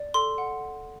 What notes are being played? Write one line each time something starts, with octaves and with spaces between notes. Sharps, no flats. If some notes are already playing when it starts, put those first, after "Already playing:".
Already playing: D5
A4 C6
F#5